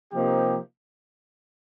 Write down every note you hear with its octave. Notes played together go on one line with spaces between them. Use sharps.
C3 F3 A#3 D#4 G4